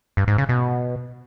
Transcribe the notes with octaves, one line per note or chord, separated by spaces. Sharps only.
G2
G#2
C#3
B2